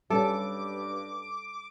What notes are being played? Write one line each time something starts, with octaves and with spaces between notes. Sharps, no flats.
G2 G3 C#4 A4 D6